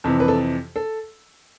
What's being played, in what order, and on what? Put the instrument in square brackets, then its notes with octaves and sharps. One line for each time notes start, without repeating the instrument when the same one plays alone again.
[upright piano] F2 C3 E3
B4
A4
A4